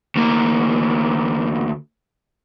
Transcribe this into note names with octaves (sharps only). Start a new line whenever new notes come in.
D2 A#3